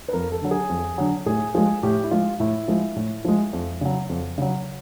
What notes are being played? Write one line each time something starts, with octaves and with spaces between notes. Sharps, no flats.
B4
F2 A#4
A4
D3 F#3
G#4
F2
D3 F#3
A2 G#4
F3 G#3 G#4
A2 G4
E4
F3 G#3 F4
A2 E4
F3 G#3
A2
F3 G#3
F2
C#3 F#3
F2
C#3 F#3